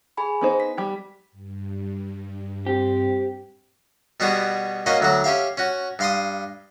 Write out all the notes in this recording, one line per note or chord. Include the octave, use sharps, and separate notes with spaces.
G#4 G#5 B5
B3 D#4 C5
B6
G3 G4
G2
C4 G4
B2 G3 B3 F#4 G#4
A#3 C#4 F#4 D#5
D2 F#3 F#4
C#4 G4 E5 F5
C#4 F#4
G2 F5 C6 D#6